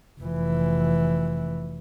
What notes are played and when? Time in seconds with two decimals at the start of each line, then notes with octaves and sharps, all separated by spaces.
0.21 F1 E3